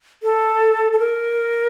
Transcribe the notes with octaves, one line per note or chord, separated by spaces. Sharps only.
A4
A4
A#4